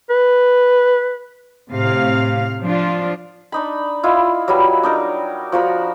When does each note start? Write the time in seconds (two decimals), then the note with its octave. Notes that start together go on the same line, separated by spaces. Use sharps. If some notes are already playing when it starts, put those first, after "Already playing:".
0.10 B4
1.70 A2 C3 F5
2.63 F3 D4 F4
3.52 D4 D#4 B5
4.03 E4 F4 D#5
4.48 F#3 G3 B4
4.83 D4 D#4 A#4
5.52 F3 F#4 A#4 B5